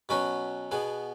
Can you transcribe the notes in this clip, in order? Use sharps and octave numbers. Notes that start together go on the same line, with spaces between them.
B2 F#3 C#4 F#4 B4
B2 B3 G#4